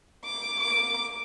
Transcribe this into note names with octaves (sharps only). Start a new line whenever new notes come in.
D6
D6